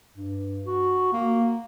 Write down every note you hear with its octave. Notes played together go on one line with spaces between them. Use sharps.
G2
F#4
A#3